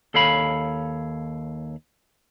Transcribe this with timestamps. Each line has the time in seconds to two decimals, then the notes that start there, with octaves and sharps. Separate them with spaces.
0.14 D#2 A4 C#5 F5 B5